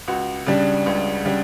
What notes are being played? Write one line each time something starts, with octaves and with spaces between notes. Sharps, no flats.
C#2 F#4
C#3 G3 D4
C#2
C#3 G3 D4